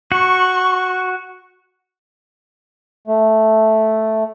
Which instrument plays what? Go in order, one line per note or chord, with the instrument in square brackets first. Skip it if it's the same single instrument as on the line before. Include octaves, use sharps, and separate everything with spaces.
[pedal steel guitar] F#4 [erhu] C#6
[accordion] A3